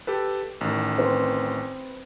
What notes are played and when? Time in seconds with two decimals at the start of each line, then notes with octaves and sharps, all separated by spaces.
0.07 G4 A4 B4
0.61 A1 D#3
0.98 C4 B4 C5